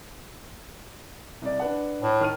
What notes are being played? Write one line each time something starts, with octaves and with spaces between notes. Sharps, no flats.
C2 D5
D4 B4 F#5
A2
D#3 F6 D#7